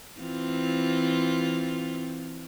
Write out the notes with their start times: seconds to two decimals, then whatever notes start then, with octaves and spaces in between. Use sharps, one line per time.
0.19 E3 C4 F4